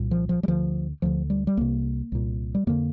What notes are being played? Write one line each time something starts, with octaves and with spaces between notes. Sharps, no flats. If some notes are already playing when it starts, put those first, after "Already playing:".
Already playing: C2 A#2
F3
F3
G3
D2 D3 F3
D2 D3 F3
G3
G3
C2 C3 A#3
C2 A#2
G3
F2 D3 A#3